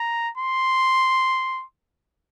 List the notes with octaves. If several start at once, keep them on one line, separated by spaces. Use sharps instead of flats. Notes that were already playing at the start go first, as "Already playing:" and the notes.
Already playing: A#5
C6